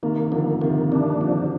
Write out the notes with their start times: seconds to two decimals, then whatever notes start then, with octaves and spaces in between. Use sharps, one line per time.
0.03 C3 D#3 A#3
0.32 D3 F3 A#3
0.61 C3 D#3 A#3
0.92 C3 D4
1.21 D3 F3